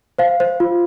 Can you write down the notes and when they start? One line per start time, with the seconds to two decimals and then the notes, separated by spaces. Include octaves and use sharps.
0.18 C5 F5
0.40 C5
0.60 F4